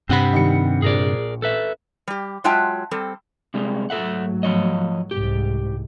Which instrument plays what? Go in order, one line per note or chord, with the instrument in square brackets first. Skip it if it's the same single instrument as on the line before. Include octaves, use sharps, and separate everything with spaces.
[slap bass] G2 C3 [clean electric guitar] C4 F#5 B5
[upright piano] D#3 G3 C#7
[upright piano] A#1 [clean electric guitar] G#4 A#4 D5
[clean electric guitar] A4 B4 E5
[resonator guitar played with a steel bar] G3 G4
F#3 G#3 F4 E5 G5 A5
G3 C4 A4
[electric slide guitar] C3 G3 G#3
[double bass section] G#2 F#3 A3 [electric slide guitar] A4 E5 F#5
[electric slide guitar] F3 C#5 D#5
[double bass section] C2 G#2 [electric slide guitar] G4